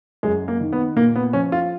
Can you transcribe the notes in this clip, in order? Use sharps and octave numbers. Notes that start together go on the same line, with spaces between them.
F#2 G#3
A#3
D#3
B3
A#2 A#3
B3
F3 C#4
F4